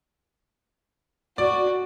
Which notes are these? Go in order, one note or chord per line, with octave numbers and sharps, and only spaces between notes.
F#4 D5